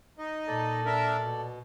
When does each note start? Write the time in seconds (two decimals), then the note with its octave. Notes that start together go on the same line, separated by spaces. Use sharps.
0.18 D#4 D#5
0.47 A#2 A4 D5
0.86 D4 A#4 E5
1.19 B2